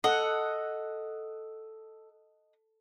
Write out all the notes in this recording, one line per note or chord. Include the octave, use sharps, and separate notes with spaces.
A4 D#5 F#5